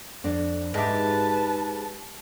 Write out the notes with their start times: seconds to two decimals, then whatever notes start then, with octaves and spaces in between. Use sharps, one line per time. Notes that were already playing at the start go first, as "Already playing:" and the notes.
0.24 F2 D4
0.74 G#2 G4 B4 D#5 E5 A5